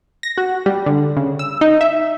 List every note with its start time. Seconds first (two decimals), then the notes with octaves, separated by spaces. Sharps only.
0.23 A#6
0.38 F#4
0.66 G3
0.86 D3
1.17 C#3
1.39 E6
1.61 D#4
1.81 E5